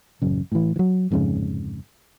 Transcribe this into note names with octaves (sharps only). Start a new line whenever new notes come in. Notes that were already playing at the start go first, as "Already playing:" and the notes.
A1 F#2 C#3
A2 E3
E3 F#3
D1 F2 G#2 C#3